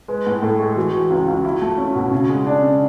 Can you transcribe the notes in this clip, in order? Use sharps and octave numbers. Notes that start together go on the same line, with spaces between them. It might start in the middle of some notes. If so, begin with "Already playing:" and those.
G#3 B4
A2
A2 A4
G#3
E3 F#4
E3
C#2
C#2
E4
A3
C#4
B2
C#3
G#3
D4
C#3